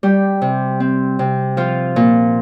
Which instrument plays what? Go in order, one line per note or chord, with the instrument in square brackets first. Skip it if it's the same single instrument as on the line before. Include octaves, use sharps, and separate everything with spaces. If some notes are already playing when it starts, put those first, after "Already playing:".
[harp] G3 G4
C3
C4
C3
F3 F4
A#2